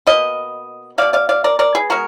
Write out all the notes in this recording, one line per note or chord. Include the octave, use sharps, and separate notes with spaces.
B2 A#3 B4 D#5
B2 A#3 D5 F5
D5 F5
D5 F5
A#4 D5
A#4 D5
G#4 B4
B2 G#3 F#4 A#4